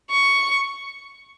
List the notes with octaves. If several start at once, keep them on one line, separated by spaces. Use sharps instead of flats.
C#6